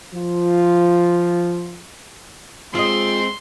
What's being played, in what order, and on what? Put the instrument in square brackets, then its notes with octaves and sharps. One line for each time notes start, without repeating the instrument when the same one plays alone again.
[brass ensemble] F3 F4
[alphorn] G#3 [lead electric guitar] C4 [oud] F4 D#5 [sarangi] C6